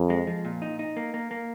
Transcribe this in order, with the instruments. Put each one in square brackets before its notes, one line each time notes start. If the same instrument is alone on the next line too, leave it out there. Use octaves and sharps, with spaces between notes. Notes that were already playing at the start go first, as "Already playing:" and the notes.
Already playing: [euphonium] F2
[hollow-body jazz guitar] G#3
F3
A#2
D#4
D#4
A#3
A#3
A#3